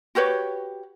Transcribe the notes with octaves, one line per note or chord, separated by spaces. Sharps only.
F#4 G4 B4 C#5